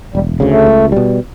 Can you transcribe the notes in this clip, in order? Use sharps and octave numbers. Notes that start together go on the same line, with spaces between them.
E1 G3
D2 C#3
A3
C#2
B2 G3